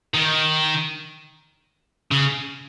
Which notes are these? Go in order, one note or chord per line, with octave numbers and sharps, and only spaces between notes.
D#3
C#3